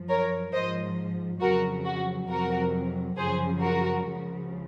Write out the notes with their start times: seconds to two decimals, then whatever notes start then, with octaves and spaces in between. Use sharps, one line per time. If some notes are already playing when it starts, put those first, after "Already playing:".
Already playing: F#2 F3
0.09 A#4 C#5
0.53 G#2 F3 C5 D#5
1.41 F2 C#3 F#3 F#4 A#4
1.85 F#4
2.29 F2 C3 F#3 F#4 A#4
3.17 F#2 C#3 F3 G#4 C5
3.61 F#4 A#4
4.05 C#2 C#3 F3